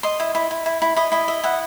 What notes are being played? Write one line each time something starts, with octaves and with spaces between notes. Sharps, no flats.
D#5 C6
E4
E4
E4
E4
E4
E4 D#5
E4 D#5
D#5 E5
E4 F#5